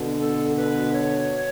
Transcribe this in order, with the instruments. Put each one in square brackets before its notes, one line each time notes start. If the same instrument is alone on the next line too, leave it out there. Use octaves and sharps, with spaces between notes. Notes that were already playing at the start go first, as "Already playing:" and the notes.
Already playing: [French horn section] B2 D3
[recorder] A4
B4
C#5